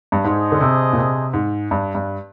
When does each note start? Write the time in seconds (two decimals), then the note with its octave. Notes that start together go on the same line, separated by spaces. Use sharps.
0.12 G2
0.24 G#2 D4 G#4 C5 D#5
0.52 D3
0.61 C3
0.93 A#2
0.97 C3
1.33 G#2
1.71 G2
1.95 G2